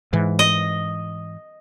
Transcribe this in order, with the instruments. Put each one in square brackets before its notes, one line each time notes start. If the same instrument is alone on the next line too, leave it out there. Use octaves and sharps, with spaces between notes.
[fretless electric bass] G#2 E3
[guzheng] D#5